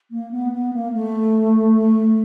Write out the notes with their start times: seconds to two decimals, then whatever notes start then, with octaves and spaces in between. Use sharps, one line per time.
0.11 A#3
0.31 B3
0.52 B3
0.73 A#3
0.93 A3